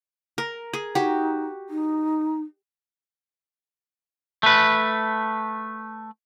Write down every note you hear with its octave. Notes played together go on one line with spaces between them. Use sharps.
A#4
G#4
D#4 F#4 G4
D#4
A3 B4